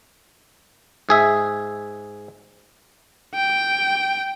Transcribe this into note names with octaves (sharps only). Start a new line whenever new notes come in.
G#2 G#4 E5
G5